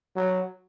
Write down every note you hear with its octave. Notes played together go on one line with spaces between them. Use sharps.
F#3